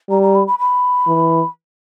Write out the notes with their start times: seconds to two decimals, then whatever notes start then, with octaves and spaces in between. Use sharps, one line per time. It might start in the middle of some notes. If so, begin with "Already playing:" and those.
0.09 G3 A#5
0.22 A#5
0.35 B5
0.47 B5
0.59 B5
1.07 E3